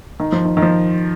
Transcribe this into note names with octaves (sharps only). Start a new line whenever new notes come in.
D#3
F3
D#3
D#3
F3